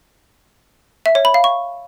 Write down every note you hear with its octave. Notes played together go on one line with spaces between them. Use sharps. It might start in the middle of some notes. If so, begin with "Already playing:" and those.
E5
C#5
B5
F5
C#6